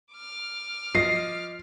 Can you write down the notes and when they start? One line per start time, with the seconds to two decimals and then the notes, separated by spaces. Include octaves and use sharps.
0.13 D6 F6
0.95 F3 D#5 C7